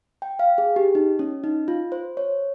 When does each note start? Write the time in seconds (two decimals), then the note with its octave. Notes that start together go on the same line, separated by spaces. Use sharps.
0.22 G5
0.39 F5
0.58 G#4
0.76 G4
0.95 D#4
1.19 C#4
1.44 D#4
1.68 F4
1.92 C5
2.17 C#5